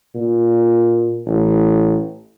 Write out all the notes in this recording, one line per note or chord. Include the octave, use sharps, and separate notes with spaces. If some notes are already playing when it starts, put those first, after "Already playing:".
A#2
A1